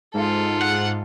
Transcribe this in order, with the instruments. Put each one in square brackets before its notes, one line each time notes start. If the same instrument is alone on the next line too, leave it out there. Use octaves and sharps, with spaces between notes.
[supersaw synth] G#2 [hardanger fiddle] F4 A4
[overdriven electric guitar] F#5